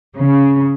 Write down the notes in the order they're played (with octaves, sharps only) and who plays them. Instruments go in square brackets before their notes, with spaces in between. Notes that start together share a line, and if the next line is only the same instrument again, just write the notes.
[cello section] C#3